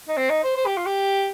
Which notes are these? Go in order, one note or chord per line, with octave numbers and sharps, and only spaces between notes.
D#4
C4
D#4
C5
C5
G4
F4
G4